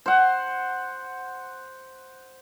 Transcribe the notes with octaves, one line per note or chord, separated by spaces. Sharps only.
C5 F#5